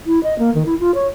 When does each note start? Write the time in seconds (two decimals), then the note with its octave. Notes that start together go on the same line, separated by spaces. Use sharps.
0.07 E4
0.23 D#5
0.39 A#3
0.55 D#3
0.66 E4
0.80 F4
0.95 C#5